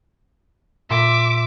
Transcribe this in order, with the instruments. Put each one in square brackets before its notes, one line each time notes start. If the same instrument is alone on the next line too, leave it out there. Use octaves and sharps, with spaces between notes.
[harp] A#2 C6 A#6 [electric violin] E5 D6